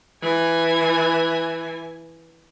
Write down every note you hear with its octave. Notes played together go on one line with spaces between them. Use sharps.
E3 G#5